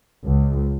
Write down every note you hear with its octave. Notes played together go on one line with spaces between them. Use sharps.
C#2